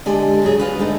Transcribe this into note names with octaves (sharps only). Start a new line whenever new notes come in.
D3 G#3 G4 D5 G#5
C#3 F#3 G#4
F4 B4
D3 G#3 A3 D#4